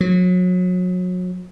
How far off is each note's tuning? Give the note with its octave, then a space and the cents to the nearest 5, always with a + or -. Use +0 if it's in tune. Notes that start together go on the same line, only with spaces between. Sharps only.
F#3 -30